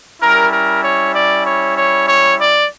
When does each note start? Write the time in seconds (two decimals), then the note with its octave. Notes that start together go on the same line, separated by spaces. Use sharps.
0.22 G3 C#4 E4 A#4
0.52 A#4
0.84 C#5
1.15 D5
1.46 C#5
1.77 C#5
2.08 C#5
2.39 D5